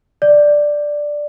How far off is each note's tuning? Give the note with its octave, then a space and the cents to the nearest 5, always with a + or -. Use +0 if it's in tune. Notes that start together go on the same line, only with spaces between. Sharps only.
D5 +5